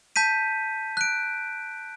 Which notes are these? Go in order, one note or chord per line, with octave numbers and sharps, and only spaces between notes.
A5 G6 B6 D#7
F#6 D7